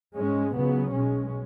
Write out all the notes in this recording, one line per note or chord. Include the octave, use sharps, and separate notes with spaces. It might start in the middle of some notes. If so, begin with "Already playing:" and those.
G#2 G#3 C#4
C#2 C#3 F#3 B3
B1 B2 G#3 C#4